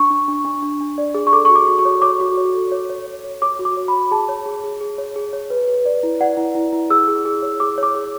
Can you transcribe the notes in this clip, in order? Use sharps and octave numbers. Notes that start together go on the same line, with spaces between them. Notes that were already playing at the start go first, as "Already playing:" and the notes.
Already playing: D4 C#6
D4
D4
D4
D4
D4
D5
G#4
C#6
A4 D6
F#4 C#6
D6
F#4
C#6
C#5
C#5 D6
F#4
C#5
A4
C#5
C#5
C#5
C#5
C#5 D6
F#4
D6
C#5
B5
C#5
G#4 A5
C#5
G#4
G#4
G#4
C#5
G#4
C#5
B4
B4
D5
E4
D5 F#5
E4
E4
E4
G#4 E6
G#4
G#4
C#5
G#4 D6
C#5
D6
G#4